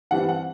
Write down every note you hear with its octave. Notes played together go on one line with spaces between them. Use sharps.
G2 E3 G3 C4 F#5
F#5